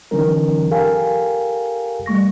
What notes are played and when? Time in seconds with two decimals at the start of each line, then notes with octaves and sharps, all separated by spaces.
0.11 D3 E3 F#3 C#4 D#4 A#4
0.70 G4 A4 A#4 F5 G5 G#5
2.06 G3 A3 C#6 A#6